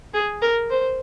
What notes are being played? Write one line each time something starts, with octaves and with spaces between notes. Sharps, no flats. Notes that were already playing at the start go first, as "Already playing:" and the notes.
G#4
A#4
C5